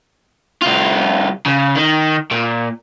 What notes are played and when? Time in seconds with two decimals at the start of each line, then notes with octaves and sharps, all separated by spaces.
0.62 C2 F4
1.46 C#3
1.76 D#3
2.31 A#2